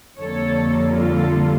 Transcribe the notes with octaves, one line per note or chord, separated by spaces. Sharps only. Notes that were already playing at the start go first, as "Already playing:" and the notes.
F2 D3 G3 A#3 A4 C#5
F4 A4